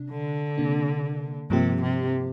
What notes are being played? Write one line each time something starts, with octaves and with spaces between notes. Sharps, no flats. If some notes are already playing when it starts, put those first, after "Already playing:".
Already playing: C3 D4
D3
C3 A#3 D4
G2 C3 F3 A#3 G4
C3